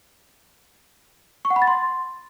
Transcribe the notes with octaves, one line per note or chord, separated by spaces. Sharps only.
C#6
F#5
B5
A6
C6